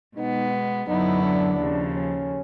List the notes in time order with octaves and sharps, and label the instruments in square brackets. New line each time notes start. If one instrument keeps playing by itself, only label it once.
[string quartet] B2 G#3 B3 [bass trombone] D#4
[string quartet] F#2 D3 F#3 B3 E4 [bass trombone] D#4
[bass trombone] D4
[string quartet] D#2 C#3 F3
[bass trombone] C#4